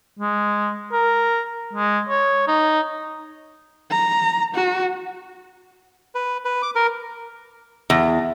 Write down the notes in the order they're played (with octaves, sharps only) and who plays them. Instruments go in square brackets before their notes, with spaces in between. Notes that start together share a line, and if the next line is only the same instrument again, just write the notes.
[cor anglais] G#3
A#4
G#3
C#5
D#4
[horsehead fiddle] A#5
F#4
[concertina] B4
B4
D6
A#4
[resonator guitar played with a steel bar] E2